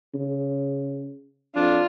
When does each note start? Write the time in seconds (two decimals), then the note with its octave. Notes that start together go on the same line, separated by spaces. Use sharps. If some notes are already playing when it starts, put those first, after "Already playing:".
0.14 C#3
1.56 F2 D4 F4